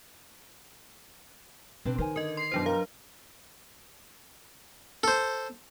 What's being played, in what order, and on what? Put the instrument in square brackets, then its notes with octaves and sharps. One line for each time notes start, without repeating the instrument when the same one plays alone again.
[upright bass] B2 [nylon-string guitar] C4 D4 B4
[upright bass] D#3 [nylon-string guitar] A#4 C5 G#5
[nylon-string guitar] D3 [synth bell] A#4 D#5
[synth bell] C6 [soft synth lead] C7
[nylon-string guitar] F#2 B2 E3 [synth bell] F#3 D4 C5
[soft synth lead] A#4 [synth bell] F5
[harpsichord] A4 C5